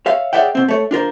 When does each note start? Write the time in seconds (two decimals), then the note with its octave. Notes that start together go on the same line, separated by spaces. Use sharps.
0.06 C#5 E5 F5
0.33 G#4 C#5 D5 E5 F#5 G5
0.55 B2 C4
0.68 A3 C#5
0.91 D4 F4 A#4 C5